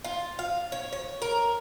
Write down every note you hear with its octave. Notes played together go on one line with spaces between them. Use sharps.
F4
F5
C#5
C#5
A#4